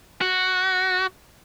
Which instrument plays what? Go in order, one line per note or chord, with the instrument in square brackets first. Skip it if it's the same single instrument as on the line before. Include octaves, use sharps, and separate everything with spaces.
[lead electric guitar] F#4